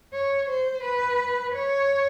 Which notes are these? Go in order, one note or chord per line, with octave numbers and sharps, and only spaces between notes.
C#5
C5
B4
C#5